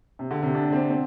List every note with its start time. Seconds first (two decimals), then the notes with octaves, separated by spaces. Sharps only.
0.19 C3
0.31 D3
0.43 C3
0.55 D4
0.72 C4
0.90 C4